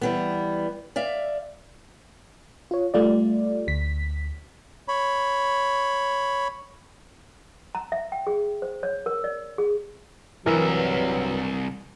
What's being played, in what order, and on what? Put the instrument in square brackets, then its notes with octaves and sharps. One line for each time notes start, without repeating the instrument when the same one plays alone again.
[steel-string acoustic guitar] E3 G3 B3
D5 E5 F5
[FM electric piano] F4 C#5
G3 A3 F4 D5
D2 B6
[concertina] C#5 B5
[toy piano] A#5
E5
G5
G#4
C5
C#5
A#4
D5
G#4
[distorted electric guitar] C2 E5 [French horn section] G2 F#3 [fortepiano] E3 A#4